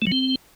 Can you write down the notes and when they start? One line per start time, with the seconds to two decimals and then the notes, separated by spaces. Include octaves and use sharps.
0.02 A3
0.07 F#3
0.12 C4